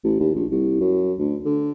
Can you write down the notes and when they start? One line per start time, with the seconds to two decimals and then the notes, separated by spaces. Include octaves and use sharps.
0.04 A1
0.20 D#2
0.35 A#1
0.51 C2
0.81 F#2
1.19 D2
1.45 D3